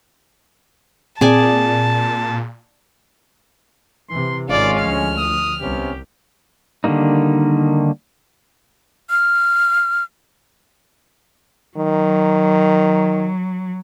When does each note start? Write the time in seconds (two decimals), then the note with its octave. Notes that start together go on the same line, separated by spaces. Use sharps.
1.21 A#2 C4 G#4 D5 G#5 A5
4.10 C3 E3 C6
4.49 G#1 D#3 G#3 C#4 F4 D5 F5
4.80 D2 F3 F6
5.18 D#6
5.61 C2 C3 B3 C#4 G4
6.84 D3 D#3 G3 A#3 D#4
9.10 F6
11.77 D#3 F#3